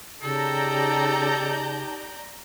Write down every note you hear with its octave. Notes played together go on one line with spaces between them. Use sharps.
C#3 D#4 G4 A4 D5 A5 A#5 G6